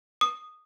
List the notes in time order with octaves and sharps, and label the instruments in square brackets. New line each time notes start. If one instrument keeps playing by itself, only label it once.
[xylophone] D#6